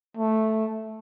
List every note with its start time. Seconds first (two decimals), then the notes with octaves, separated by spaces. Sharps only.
0.17 A3